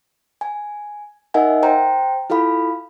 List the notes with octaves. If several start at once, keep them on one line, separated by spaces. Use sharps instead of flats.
G#5
D#4 A#4 D#5 E5 F#5 G#5
C5 G5 A#5
E4 F4 A4 F5 B5